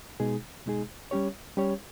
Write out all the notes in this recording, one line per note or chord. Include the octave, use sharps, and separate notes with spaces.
B2 G#3 D#4 G#4
B2 G#3 D#4 G#4
G3 C#4 G4 C#5
G3 C#4 G4 C#5